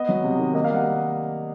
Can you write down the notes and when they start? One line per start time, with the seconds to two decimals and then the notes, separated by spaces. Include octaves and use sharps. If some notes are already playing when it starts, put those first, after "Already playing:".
Already playing: B3 D#5
0.09 F#3
0.24 C3
0.39 D#3
0.54 A#3 D#5
0.64 F5
0.70 G3 F#5